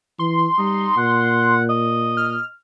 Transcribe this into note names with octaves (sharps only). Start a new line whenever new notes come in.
E3 C6
G3 D#4
A#2 F#5
D#5
F6